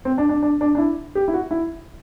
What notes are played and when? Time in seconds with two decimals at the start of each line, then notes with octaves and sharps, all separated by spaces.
0.05 C4
0.18 D4
0.29 D4
0.43 D4
0.61 D4
0.75 D4
0.78 E4
1.15 G4
1.28 E4
1.34 F#4
1.51 E4